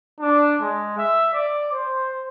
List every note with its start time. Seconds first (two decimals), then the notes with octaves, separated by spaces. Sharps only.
0.20 D4
0.61 G#3
0.98 E5
1.33 D5
1.71 C5